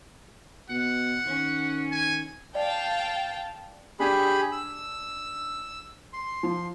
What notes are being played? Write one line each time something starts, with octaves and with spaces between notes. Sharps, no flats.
B2 F#5
D#3 C#4
G#5
D5 F5 G5 A5
D4 G4 G#4 B5
E6
C6
F3